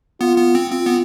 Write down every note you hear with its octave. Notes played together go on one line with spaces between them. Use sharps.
B3 F4
B3
C4
C4 F4
B3